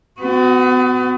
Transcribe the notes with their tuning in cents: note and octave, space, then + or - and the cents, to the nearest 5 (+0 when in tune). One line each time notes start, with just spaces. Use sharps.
B3 +40 F#4 +0